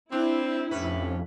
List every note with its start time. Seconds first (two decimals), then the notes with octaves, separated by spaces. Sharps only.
0.12 C4 D4 E4
0.71 F2 A2 C3 C#4 B4